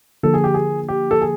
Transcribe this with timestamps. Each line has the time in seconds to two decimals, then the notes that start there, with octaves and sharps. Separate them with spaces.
0.23 D3 F3 A#3 A4
0.34 G#4
0.44 G4
0.54 G#4
0.89 G4
1.11 A4
1.21 G#4